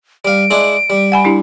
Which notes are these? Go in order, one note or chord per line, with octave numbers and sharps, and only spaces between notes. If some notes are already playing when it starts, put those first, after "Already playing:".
G3 F5 D7
G#3 D4 E4
G3
F#5 G#5 B5
D4 E4 G4